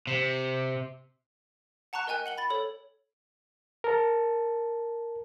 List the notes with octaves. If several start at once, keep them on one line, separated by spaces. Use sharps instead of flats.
C3
F#5 A5 A#5 C#6 F#6
A#4 D#5 G5 G#5 F#6
F#5 F#7 G7
B5 A6
A4 C#5 F#7
A#4 A5